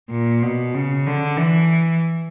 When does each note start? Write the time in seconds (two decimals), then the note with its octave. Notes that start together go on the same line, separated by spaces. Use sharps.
0.11 A#2
0.43 B2
0.74 C#3
1.07 D3
1.37 E3